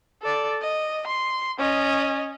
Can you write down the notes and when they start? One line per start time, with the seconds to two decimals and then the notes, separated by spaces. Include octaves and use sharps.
0.23 A4 D5
0.62 D#5
1.07 C6
1.59 C#4 D#5